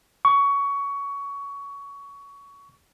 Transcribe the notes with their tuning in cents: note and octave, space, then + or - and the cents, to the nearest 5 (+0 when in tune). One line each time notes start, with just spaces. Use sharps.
C#6 +20